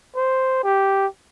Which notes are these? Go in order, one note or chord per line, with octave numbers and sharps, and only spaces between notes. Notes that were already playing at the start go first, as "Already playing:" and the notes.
C5
G4